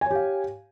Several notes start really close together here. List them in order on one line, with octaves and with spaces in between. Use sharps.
G#5 C#5 G4 F5